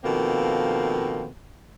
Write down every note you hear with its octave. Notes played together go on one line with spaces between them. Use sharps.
B2 D#3 F3 A#3 C4 A4